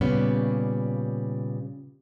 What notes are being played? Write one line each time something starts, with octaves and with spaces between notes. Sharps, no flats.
A#2 C#3 G3 B3 C#4